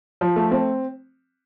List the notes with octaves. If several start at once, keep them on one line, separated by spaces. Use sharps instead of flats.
F3
A3
C4